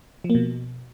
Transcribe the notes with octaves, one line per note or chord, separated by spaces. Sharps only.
F3
A#3
B2